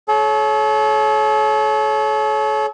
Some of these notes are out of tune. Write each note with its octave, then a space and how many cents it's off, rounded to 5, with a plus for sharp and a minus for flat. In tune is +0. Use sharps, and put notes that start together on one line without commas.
A4 -40 C#5 +0